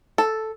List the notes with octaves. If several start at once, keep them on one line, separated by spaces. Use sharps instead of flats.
A4